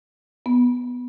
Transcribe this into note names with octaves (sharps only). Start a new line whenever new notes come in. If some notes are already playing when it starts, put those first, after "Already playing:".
B3